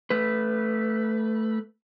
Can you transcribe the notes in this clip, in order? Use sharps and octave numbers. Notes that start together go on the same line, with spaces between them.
A3 B4